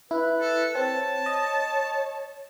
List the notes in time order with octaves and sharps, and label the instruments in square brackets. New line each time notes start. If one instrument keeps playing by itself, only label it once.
[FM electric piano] E4 [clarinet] B4
[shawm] A4
[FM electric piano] C4 [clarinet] C#5 [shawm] A5
[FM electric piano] D#5